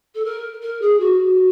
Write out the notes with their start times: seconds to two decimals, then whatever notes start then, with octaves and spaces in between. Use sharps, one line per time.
0.15 A4
0.25 A#4
0.62 A#4
0.81 G#4
1.00 F#4